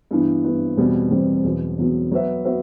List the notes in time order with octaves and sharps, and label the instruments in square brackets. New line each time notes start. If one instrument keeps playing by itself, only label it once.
[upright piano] G2 E3 B3
G2 E3 B3
E2 B2 G3 C4
E2 B2 G3 C4
E2 B2 F#3 B3
E2 B2 F#3 B3
F#3 B3 F#4 B4 E5
B3 F#4 B4 E5